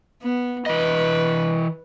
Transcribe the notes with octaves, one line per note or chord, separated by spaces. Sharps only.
B3
E3 B4 D#5